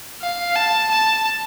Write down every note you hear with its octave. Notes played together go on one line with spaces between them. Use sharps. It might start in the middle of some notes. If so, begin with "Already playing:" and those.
F5
A5
A5